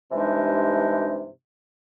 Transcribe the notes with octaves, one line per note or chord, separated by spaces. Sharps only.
G2 C3 E3 G#3 D4 D#4